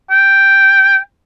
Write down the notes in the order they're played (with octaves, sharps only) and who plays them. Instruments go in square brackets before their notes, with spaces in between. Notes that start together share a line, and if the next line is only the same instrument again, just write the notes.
[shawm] G5